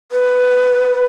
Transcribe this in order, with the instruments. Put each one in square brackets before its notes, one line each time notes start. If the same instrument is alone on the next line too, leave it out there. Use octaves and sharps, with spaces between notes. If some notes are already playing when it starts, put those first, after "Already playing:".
[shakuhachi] B4